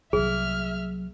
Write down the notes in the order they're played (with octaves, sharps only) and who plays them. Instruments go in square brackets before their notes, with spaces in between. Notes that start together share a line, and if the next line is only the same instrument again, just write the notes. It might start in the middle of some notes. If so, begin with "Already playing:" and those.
[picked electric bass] C2 [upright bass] F#3 A#3 [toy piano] G#4 [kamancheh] E5 F6